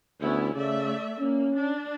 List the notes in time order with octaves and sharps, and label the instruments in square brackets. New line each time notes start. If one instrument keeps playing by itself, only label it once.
[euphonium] D2 [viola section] B3 C#4 E4
[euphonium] C#3 [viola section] A3 D5 E5
[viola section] A#3 [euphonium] C#4
[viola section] D4